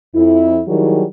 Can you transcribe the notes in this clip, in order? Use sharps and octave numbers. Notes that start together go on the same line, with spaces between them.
F2 E4
D#3 F#3 G3 E4 G#4